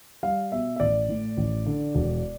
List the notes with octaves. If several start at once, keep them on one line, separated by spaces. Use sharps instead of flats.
G3 F5
B2 E5
E5
A1 D5
A2
A1
D3
E1